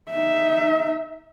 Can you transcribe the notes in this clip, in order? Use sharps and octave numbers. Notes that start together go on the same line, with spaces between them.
D#4 E5